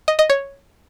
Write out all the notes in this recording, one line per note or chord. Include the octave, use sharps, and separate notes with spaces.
D#5
D#5
C#5